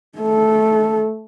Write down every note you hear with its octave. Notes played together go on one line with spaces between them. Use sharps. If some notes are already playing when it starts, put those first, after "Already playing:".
A3 A4